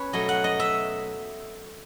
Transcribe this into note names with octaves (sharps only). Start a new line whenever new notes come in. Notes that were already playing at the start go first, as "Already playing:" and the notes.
Already playing: C#4 B4 C#5
B2 F#3 A3 D#5
F#5
D#5
E5